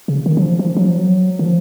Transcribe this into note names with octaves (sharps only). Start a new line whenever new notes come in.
C#3
D#3
F#3
F3
F3
F#3
F3
F#3
D#3
F3